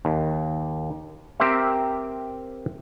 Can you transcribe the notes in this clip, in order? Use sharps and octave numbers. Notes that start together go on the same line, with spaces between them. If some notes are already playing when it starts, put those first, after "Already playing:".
D#2
C4 G4 A#4 C5 E5